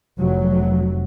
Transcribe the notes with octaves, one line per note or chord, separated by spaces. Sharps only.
F1 F#3